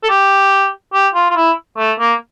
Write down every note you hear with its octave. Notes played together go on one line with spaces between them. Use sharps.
A4
G4
G4
F4
F4
E4
A3
A#3